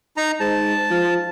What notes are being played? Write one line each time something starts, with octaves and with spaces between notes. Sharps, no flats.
D#4 A#5
G#2 A5
F3